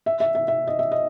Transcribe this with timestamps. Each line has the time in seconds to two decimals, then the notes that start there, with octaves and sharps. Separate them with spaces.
0.06 E5
0.20 E5
0.35 E5
0.48 E5
0.67 D#5
0.79 E5
0.91 D#5